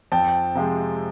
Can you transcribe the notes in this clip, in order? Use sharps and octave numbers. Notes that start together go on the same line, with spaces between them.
F2 G5 A5
C3 F3 G#3